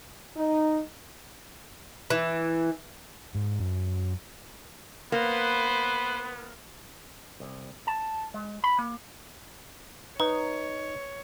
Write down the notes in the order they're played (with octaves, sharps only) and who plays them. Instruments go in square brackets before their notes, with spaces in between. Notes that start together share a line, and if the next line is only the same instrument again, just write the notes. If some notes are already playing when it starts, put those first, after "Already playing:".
[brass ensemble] D#4
[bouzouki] E3
[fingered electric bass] G#2
F#2
[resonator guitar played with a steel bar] A#3 [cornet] B3 [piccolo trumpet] B4 [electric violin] C5
[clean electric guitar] C2
A5
G#3
B5
A#3
[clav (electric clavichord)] D#4 [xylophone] B4 [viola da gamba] C#5